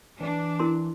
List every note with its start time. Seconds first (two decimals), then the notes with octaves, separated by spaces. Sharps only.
0.20 E3 D4
0.59 E4 A#4 C6